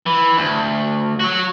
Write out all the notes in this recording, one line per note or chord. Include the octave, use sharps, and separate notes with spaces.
E3
D2
F#3 F#4